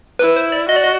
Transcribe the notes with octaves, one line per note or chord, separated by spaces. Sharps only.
E4 B4
C5
D5
F#4 D#5
D5
D#5